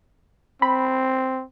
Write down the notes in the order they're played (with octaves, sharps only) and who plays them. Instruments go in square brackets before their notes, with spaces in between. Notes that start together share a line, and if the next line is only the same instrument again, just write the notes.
[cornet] C4 [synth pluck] B5